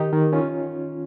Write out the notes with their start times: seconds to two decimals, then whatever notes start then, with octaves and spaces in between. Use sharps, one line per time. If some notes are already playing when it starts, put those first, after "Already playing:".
Already playing: D#3 D#4 G4
0.13 D#3
0.33 C#4 F4